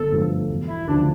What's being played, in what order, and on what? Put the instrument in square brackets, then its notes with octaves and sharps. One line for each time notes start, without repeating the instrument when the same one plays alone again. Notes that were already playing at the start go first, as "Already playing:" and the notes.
Already playing: [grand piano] G1 [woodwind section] A4
[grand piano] G2 F3 A3
E1
[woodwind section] E4
[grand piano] D2 C#3 F3 [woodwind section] D4